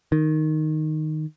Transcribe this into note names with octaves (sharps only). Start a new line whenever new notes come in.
D#3